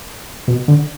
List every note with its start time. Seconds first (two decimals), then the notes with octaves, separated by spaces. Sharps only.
0.48 B2
0.68 D3